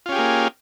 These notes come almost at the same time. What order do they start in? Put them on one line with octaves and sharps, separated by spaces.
F4 C#4 G4 G#4 A#3